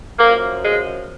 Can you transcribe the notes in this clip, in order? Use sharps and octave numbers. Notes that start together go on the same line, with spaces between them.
F#2 F3 A#3
G#3